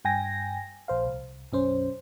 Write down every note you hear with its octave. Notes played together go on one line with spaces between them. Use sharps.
G2 G5 G#5 A#6
A#1 C5 F5
C2
B1 F#2 C#4 C5